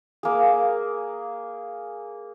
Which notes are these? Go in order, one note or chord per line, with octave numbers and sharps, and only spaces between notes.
A#3 G#4